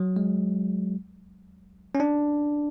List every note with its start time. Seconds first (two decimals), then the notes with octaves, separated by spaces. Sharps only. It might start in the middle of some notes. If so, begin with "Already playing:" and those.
Already playing: F#3
0.16 G#3
1.95 C#4
2.00 D4